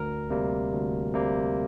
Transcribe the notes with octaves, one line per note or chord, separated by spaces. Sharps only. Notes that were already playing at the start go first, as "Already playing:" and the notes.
Already playing: D2 A#4
C3 G3 A#3
D2
C3 G3 A#3